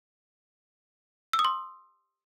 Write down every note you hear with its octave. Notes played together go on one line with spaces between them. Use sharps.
E6
D#6
C6